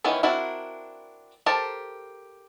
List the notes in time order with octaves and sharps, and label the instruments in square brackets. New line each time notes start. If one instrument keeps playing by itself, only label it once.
[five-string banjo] D#3 E3 B3 C#4 E4
C4 D4 E4 F#4 A#4
G4 A4 A#4 C5 A5